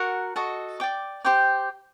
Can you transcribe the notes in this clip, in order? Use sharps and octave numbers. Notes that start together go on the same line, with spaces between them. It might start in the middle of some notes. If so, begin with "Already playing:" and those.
Already playing: F#4 A#4 F#5
F#4 A4 D#5 A5
D5 G5 D6
G4 C5 G5 D6